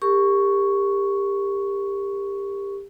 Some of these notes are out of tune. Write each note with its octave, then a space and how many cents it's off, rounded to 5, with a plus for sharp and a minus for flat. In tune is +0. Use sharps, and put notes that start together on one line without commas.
G4 +25 A#4 -25 C#6 +0